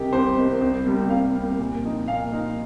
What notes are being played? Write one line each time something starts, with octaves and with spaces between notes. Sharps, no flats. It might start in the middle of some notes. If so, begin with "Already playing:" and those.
Already playing: C2 C3 D#3 G4
C2 C5
C3 D#3
C2
C3 G3 A#3
C2 F5
C3 G3 A#3
A#2
F3 D#4
A#2 F5
F3 D#4